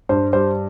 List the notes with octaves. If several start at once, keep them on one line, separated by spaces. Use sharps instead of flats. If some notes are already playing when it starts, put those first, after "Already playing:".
G2 C5
G3 C5